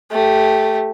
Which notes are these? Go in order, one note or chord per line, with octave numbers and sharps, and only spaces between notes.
A3 G4